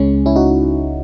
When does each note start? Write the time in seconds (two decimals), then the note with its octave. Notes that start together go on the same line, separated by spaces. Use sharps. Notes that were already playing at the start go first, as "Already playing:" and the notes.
Already playing: C#2 C#3 G#3 C#4
0.26 C#4 E4
0.36 D#4 F#4